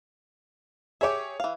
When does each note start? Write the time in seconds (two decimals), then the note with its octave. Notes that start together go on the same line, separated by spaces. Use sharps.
1.01 G4 G#4 C#5 E5
1.40 E3 F5